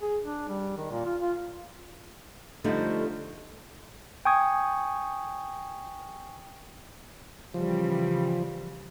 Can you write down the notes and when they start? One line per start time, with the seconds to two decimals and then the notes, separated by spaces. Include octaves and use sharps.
0.02 G#4
0.24 D4
0.49 G3
0.77 D#3
0.91 A#2
1.06 F4
1.21 F4
2.64 D3 F3 G3 A3 C4 D#4
4.25 G5 G#5 C#6 D#6 G#6
7.54 C#3 E3 F3 G3